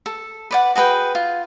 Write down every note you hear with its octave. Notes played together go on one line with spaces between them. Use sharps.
A4
B4 D5 F#5
F#4 G#4 B4 G5
F4